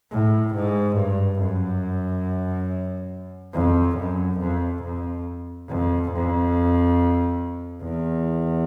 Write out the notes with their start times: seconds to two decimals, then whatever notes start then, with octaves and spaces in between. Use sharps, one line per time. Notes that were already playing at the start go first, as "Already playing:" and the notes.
0.11 A2
0.55 G#2
0.97 G2
1.40 F#2
3.54 F2
3.98 F#2
4.40 F2
4.83 F2
5.69 F2
6.12 F2
7.83 E2